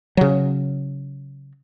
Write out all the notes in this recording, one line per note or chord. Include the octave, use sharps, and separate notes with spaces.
C#3 F#3